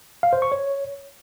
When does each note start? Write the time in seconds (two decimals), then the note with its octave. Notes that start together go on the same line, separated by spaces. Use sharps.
0.23 F5
0.33 C5
0.42 C#6
0.52 C#5